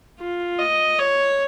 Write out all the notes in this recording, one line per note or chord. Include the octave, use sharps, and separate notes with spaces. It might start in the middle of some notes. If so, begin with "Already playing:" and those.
F4
D#5
C#5